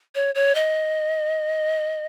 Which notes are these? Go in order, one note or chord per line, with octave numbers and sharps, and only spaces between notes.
C#5
C#5
D#5